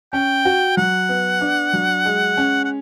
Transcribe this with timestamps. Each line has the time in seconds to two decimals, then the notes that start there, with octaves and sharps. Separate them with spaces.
0.13 C#4 G5
0.45 F#4
0.77 F#3 F#5
1.09 B3
1.41 D4
1.73 F#3
2.05 G#3
2.37 C#4
2.65 F#5